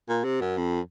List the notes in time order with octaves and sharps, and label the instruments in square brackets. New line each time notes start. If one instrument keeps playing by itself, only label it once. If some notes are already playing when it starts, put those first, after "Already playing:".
[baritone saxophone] A#2
C3
F#2
F2